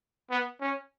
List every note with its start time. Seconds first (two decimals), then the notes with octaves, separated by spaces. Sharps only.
0.30 B3
0.61 C#4